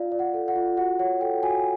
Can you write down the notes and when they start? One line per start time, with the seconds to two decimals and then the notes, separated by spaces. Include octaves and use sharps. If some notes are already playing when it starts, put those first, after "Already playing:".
Already playing: F4 D5 F5
0.12 D5
0.19 F#5
0.34 A4
0.48 F#5
0.56 F4
0.77 F#4 F#5
0.99 C#5 F#5
1.21 A4 G5
1.43 F#4 G#5